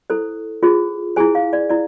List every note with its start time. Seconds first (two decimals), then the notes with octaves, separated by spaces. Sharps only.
0.10 E4 A4 C5
0.63 F4 G#4 C5
1.16 E4 G#4 C5 G#5
1.35 F5
1.53 D5
1.69 E4 D5